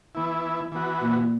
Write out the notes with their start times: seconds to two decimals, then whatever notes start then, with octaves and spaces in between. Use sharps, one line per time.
0.15 E3 B3 E4
0.72 E3 B3 F#4
1.01 A#2